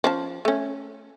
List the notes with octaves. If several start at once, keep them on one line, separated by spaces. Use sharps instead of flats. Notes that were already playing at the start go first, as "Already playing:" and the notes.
F3 C#4 A5
A3 C#4